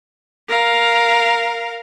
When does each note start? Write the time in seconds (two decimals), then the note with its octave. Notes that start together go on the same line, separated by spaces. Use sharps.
0.48 A#4 F5